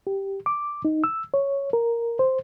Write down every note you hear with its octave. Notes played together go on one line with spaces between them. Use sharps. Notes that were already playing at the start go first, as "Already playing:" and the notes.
G4
D6
D#4
E6
C#5
A#4
C5